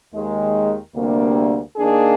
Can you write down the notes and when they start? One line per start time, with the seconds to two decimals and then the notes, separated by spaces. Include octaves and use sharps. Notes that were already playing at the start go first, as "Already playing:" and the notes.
0.12 D#2 D#3 G#3
0.94 D2 C3 G3 A#3 D4
1.75 D#3 A#3 D4 G#4